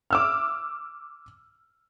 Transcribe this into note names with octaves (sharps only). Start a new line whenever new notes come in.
D6 E6 F6